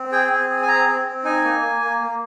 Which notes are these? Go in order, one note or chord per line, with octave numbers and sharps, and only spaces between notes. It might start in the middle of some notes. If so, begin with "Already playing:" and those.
Already playing: C4
G#4 G5
C4
G#4
G#5
C4 A#5
C4
C4
D#4 G#5
A#3
A#3
A#3
A#3